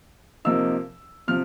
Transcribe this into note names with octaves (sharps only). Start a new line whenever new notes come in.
C3 F3 A#3 D#4 E6
C3 F3 F6